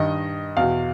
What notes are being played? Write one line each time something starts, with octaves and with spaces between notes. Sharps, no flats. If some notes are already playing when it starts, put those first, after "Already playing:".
Already playing: G2 D#3 D#5
E2 B2 F5